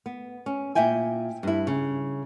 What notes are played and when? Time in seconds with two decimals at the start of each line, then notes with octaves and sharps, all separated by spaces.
0.06 B3
0.46 C#4
0.75 A#2 E4 E5 G5 G#5
1.43 G2 E4
1.67 C#3